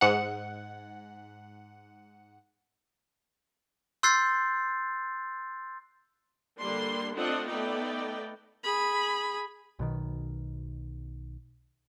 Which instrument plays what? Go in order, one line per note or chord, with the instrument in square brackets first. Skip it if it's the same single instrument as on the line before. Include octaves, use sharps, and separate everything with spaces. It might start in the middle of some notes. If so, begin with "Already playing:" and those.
[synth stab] G#2 F#5
[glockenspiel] C6 E6 F#6 G6 A6 C7
[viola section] D3 G3 A#3 D4 C6
A3 C4 D4 F4 D#5 F#5
A3 B3 D#4 D5 G5
[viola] G#4 B5
[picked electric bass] B1 B2 D#3